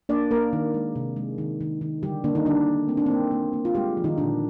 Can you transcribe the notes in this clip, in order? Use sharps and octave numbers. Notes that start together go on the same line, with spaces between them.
A#3 D4 D5
A#3 A#4
D#3
G#3
C3
G#3
D#3
D#3
D#3
D3 G3 G4
D3 A#3 D4
D#3 D#4
D3 G3 D4
A#3
A#3 C4
D4
A#3 C4
A#3
A#3
F4
G3 G#3 G4
F3
D#3 D#4
A#2 D3 D4